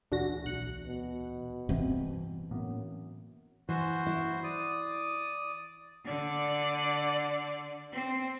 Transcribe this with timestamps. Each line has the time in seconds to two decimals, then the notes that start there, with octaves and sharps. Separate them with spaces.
0.12 D2 A#2 E3 D4 F#4 A#6
0.45 B1 F#6 C#7
0.87 B2
1.69 G2 C3 E3 C4
2.51 F#2 A2 A#3 B3
3.69 E3 F#4 C5
4.07 E4
4.44 D5 D#6
6.05 D3 D5
7.93 C4